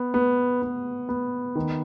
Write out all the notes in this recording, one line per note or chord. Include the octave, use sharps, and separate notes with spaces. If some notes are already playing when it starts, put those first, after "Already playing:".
Already playing: B3
B3
B3
B3
D#3